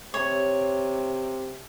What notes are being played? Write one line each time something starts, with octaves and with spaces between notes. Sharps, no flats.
C3 C#5